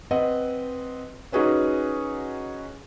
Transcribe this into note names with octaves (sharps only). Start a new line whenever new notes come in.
C4 B4 D#5 F#5
C#4 D#4 F#4 G#4 B4 C#5